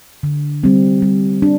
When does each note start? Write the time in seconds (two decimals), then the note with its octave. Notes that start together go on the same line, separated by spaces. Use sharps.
0.23 D3
0.63 G3 C4
1.02 G3
1.42 D4